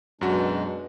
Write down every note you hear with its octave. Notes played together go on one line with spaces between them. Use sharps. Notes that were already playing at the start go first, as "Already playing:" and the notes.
F#2 B2 G#3 D4 F#4